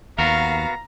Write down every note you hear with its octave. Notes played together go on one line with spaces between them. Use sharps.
D#2 B3 F#4 A#4 F5 A#5